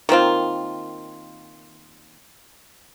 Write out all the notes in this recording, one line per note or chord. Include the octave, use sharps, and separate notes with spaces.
D#3 A#3 C4 F4